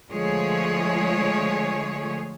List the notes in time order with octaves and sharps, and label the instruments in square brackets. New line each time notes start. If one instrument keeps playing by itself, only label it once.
[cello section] D3 F3 G#3 A3 G#4 C#5